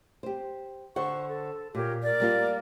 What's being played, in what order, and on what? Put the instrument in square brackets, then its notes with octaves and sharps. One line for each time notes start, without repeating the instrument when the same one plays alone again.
[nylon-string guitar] G4 C5
[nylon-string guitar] D3 C5 F#5 [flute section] C#6
[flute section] A4
[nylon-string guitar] A#2 [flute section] G4 A#4 C#5
[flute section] A#4 D5
[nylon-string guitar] G3 A#3 F4